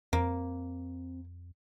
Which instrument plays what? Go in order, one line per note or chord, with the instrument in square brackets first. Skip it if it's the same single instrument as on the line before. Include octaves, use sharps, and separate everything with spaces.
[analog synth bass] F2 [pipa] A#3 [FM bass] C4